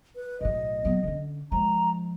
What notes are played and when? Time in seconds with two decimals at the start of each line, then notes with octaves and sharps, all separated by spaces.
0.15 B4
0.41 B1 A2 D#5
0.85 F#3 B3
1.03 D3 C#4
1.52 F3 G#3 A#5